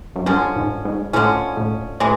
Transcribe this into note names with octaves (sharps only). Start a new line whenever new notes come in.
F#2
G2 D3 F3 G#3 C#4
G#2
G#2
A2 D3 F3 G#3 C#4
A2
A2 C3 E3 G#3